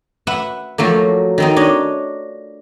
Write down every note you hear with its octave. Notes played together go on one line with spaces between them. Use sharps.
B4 E5 F#5
F3 F#3 A3 A#3
D#3 C4 D#4
D4 C#5 D#5